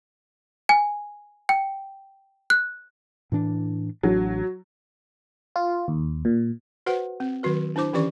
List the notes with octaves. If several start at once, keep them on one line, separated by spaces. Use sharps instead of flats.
G#5
G5
F#6
A2 E3 D4
A1 F#3 D4
F4
D#2
A#2
F#4 B4 C5 F#5
C4
D#3 F#3 F#4 B4
D4 E4 C5 D6
D#3 E3 C#4 G4 D5 C#6